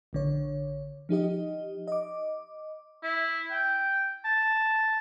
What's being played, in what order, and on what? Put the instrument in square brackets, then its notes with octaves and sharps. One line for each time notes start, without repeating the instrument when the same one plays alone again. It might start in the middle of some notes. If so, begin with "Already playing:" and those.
[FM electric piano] A#1 D3 C#5
F3 D#4 G4 D#5
D#5 D6
[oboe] E4
G5
A5